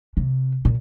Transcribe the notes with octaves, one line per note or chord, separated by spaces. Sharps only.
C3
A#2